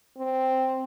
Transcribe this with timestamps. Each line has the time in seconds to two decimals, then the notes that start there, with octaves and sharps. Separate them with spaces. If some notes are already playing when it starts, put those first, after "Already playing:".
0.18 C4